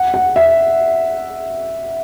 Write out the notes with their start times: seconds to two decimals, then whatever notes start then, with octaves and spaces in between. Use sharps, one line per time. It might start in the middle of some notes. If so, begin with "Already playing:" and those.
Already playing: F#5
0.14 F#5
0.36 E5